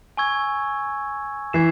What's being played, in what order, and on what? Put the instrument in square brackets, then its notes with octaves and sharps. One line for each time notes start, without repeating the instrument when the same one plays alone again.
[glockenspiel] G#5 C#6 E6 G#6
[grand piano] E3 [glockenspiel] G#6 C7 E7